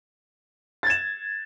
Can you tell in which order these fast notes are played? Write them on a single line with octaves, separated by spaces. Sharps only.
A6 G#6 E7